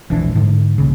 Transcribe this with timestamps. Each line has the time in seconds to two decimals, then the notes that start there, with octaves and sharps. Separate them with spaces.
0.10 E1 A#1 E3 D4
0.35 G#2 D3
0.78 D#1 A#1 C#3